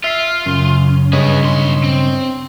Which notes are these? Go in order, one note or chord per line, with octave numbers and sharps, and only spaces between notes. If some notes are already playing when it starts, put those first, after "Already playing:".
F4 E5 F6 C7
F#2 C#3
G2 G#4 B4 C#5 D#5
B1 C6
C4